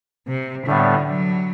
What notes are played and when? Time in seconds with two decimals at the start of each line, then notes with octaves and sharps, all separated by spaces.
0.27 C3
0.67 A2 D3 G3 B3
1.07 F#3